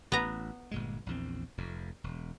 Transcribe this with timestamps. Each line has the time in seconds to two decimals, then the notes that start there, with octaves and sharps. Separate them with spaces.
0.12 A1 B3 B4 A#5
0.71 G1 A#2 G#3
1.06 A#1 E2 C4
1.58 F1 F2
2.04 E1